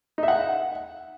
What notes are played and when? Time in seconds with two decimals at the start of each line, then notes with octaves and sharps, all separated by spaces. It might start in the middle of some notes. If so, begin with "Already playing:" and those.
0.18 D#4
0.23 E5
0.28 F#5